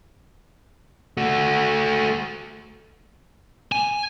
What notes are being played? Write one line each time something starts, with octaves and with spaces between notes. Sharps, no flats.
A3 F#4
G#5